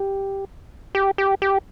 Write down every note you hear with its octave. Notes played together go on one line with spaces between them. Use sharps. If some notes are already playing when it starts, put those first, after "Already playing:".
Already playing: G4
G4
G4
G4